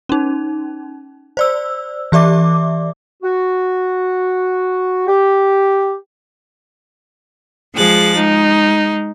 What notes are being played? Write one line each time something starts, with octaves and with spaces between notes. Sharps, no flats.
C#4 D#4
C5 D5 E6
E3 G4 D5 E5 D6
F#4
G4
F3 G#3 G#4 F#6 A6
G#3 D#4